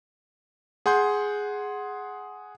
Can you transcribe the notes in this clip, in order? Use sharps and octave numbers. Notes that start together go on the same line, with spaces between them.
G#4 F#5 C6 G6